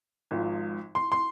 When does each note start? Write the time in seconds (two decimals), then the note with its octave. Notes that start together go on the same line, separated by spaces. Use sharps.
0.31 G#1 G#2 F3
0.95 C6
1.12 C6